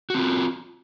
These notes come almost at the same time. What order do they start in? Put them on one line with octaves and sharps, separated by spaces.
F#4 C4 F4